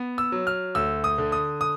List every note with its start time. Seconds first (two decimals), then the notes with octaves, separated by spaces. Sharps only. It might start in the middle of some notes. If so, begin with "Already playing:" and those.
Already playing: B3
0.18 E6
0.32 F#3
0.47 F6
0.75 D2 E6
1.04 D#6
1.18 D3
1.32 D#6
1.61 D#6